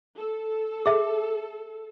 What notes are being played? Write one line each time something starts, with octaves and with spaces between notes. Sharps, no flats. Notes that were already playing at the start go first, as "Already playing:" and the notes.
A4
G#4 E5